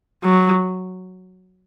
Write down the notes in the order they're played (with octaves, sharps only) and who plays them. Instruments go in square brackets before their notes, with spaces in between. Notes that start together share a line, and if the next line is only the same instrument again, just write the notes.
[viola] F#3